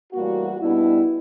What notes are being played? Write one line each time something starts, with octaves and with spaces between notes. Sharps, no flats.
A2 E3 G3 A#3 F#4
B2 G3 B3 D4 E4